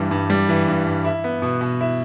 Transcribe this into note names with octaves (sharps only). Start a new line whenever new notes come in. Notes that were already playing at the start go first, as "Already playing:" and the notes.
Already playing: G2 E3 G3
G2
G3
E3
G2
G2
E4
B3
B2
B2
E4